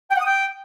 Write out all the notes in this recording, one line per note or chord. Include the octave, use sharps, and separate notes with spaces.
G5
F#5
D#6
G5